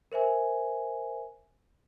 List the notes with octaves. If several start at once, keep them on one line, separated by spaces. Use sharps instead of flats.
A#4 C5 E5 G#5